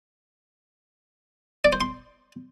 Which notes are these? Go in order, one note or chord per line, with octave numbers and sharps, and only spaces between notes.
D5
C5
C6